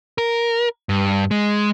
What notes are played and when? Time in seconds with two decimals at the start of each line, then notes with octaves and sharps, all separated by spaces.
0.18 A#4
0.89 G2
1.31 G#3